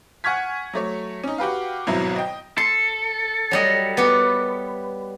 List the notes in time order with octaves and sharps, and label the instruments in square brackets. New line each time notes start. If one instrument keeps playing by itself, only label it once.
[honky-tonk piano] F#5 G#5 C#6 F6 G#6 B6
F#3 A3 C#5
C#4 D#4
F#4 G4 B4 F5
G#1 B2 F#3 E4
D#5 G5
[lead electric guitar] A4 [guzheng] C6
[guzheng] F#3 G3 D#5
B3 G4 B4